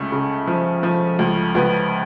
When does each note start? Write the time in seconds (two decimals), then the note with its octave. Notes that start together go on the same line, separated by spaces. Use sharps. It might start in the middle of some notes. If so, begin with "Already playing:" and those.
Already playing: C#2 C#3 A3
0.12 C#3
0.47 F3
0.83 F3
1.19 C#2
1.55 C#2 B3